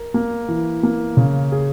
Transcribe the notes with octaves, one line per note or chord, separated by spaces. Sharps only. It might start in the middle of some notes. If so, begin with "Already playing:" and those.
Already playing: A#4
A#3
E3
A#3
C#3
G#4